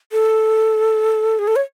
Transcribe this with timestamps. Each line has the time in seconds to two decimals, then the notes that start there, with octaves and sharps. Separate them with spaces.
0.12 A4
1.39 G#4
1.47 A4
1.56 C#5